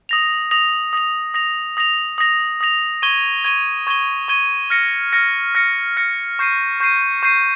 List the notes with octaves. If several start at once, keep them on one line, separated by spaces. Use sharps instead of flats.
D#6 A#6 F7
D#6 A#6 F7
D#6 A#6 F7
D#6 A#6 F7
D#6 A#6 F7
D#6 A#6 F7
D#6 A#6 F7
C#6 G#6 D#7 G7
C#6 G#6 D#7 G7
C#6 G#6 D#7 G7
C#6 G#6 D#7 G7
F6 A#6 C#7
F6 A#6 C#7
F6 A#6 C#7
F6 A#6 C#7
C#6 G6 C7 D#7
C#6 G6 C7 D#7
C#6 G6 C7 D#7